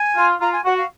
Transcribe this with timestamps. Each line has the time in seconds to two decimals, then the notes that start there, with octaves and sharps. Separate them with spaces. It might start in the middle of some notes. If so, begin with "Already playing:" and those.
Already playing: G#5
0.17 F4
0.40 F4 A#5
0.52 G#5
0.65 F#4 F#5
0.77 F5